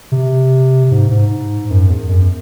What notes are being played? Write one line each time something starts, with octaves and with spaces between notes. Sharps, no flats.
C3
G#2
G#2
F#2
E2
F#2